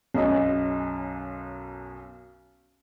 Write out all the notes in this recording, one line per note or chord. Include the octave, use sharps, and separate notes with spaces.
B1 F#2 C#4 D#5